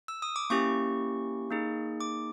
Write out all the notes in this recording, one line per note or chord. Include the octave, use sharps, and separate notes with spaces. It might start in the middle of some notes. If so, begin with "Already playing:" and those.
E6
D#6
D6
A#3 C#4 E4 G4 C#6
A#3 D#4 G#4
D6